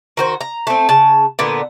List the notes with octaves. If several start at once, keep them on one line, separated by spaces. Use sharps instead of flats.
D#3 F#4 C5
A#5
A3 C4
C#3 A5
A#2 D3 B3